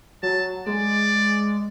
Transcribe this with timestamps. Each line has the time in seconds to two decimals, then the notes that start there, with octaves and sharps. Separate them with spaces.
0.23 F#3 A5
0.66 G#3 D5